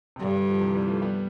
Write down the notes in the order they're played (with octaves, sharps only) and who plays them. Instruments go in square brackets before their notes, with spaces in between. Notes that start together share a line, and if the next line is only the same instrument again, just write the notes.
[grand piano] C3
[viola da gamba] G2 [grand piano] D3
[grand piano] F3
C3 E3
E3 G3
F3 A3
G3 B3